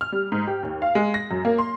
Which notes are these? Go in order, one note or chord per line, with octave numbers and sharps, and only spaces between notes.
F6
G3
G#2
G4
D#2
F5
G#3
A#6
F#2
A#3
C6